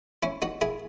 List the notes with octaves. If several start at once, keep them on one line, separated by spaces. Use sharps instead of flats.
C#4 E4
D#4 F#4
E4 G#4